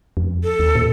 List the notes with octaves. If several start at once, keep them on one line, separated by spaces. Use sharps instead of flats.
F2
A4
D#2
A#2